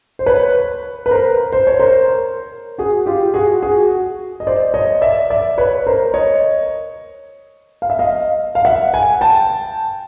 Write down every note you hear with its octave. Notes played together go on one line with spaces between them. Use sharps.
C5
B4 C#5
B4
A#4 C5
C5
C#5
A#4 C5
F#4 G#4
F4 G4
F#4 G#4
F#4 G#4
D#5
C5 D5
C#5 D#5
D5 E5
D5 E5
B4 C#5
A#4 C5
C#5 D#5
F5
E5
D#5 F5
F5
E5 F#5
F#5 G#5
G5 A5